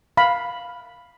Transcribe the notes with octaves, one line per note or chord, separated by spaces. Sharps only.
F5 B5